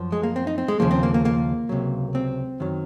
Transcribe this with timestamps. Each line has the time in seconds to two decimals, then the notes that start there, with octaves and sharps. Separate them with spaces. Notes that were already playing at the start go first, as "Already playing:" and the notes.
Already playing: F#2 F3
0.12 G#3
0.23 A#3
0.36 C4
0.47 D#4
0.58 C4
0.68 G#3
0.80 D#2 C#3 F3 A#3
0.91 C4
1.03 A#3
1.14 A#3
1.25 A#3
1.69 C#2 C3 F#3
2.15 C4
2.60 F#2 D#3 F#3